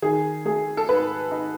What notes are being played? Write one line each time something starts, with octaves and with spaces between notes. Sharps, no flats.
D#3 G#4
A3 G#4
A4
G#2 B4
D#4